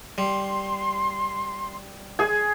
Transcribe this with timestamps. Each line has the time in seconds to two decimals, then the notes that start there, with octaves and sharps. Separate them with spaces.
0.18 G3 C6
2.19 G#4 G#5